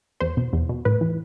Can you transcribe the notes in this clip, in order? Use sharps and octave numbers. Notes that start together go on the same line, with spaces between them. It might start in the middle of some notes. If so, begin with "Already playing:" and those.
E2 C5
B2
E2
B2
A2 B4
E3